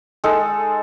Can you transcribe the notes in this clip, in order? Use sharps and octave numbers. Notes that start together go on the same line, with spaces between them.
G#3 D#4 A4